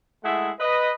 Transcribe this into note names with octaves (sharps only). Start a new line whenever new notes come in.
G#3 A3 E4 G#4 E5 F#5
B4 D#5